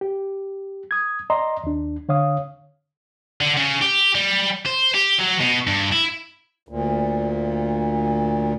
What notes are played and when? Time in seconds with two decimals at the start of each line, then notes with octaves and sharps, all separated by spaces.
0.01 G4
0.91 D#6 G#6
1.30 D5 D#5 A#5 C6
1.64 D#2 D4
2.09 D3 C#5 F5 D#6
3.41 D3
3.57 C#3
3.81 G4
4.15 G3
4.66 C5
4.94 G4
5.18 F#3
5.40 B2
5.67 G2
5.92 E4
6.69 D2 A#2